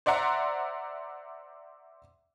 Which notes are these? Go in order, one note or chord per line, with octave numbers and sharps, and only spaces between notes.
C5 D5 E5 F#5 A#5 C6